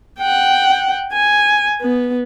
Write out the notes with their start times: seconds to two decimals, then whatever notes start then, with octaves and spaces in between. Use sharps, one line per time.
0.19 F#5 G5
1.13 G#5
1.81 B3